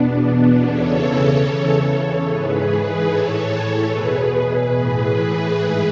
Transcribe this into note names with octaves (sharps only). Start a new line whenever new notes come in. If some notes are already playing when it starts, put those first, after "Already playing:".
Already playing: E2 B2 B3 D4
E2 C#3 E3 A4 C#5
E2 C#3 E3
G#2 E3 G#4 B4
A2 E3 A4 C#5
E2 B2 G#4 B4
A2 E3
G#2 E3